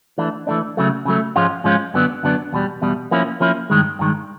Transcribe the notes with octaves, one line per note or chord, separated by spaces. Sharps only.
E3 A3 D4
E3 A3 D4
C#3 F#3 A3
C#3 F#3 A3
G#2 F3 G#3 C#4 F4
G#2 F3 G#3 C#4 F4
F#2 D3 F#3 B3 D4
F#2 D3 F#3 B3 D4
E2 B2 G3
E2 B2 G3
F3 A#3 C#4 E4
F3 A#3 C#4 E4
G2 D#3 G#3
G2 D#3 G#3